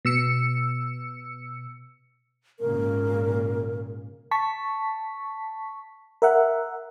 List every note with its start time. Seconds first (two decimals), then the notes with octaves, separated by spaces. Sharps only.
0.05 B2 E6 C#7
2.60 G#1 A#2 C#3 A#4
4.31 A5 C#6 B6
6.22 A#4 E5 F#5